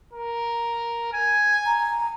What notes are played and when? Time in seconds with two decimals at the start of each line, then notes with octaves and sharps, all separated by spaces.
0.13 A#4
1.13 G#5
1.66 A#5